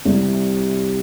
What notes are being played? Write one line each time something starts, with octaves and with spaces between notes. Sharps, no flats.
C2 C3 G3 C4